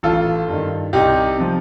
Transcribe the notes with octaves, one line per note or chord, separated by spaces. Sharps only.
A1 F4 A4
G2 D#3
C2 D#4 G4
C3 F3